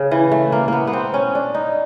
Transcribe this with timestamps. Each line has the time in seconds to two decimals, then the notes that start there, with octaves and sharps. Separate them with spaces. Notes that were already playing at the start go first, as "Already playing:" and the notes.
Already playing: C#3
0.11 E3
0.32 A3
0.52 A#3
0.68 A#3 B3
0.87 B3
0.93 C4
1.14 C#4
1.35 D4
1.54 D#4